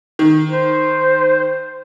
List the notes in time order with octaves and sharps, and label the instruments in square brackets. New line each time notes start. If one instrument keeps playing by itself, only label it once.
[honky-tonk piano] D#3
[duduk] C5